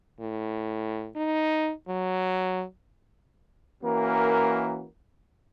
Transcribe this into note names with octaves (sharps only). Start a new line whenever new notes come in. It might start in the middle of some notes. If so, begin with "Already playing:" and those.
A2
D#4
F#3
E3 A#3 C#4 F#4 A#4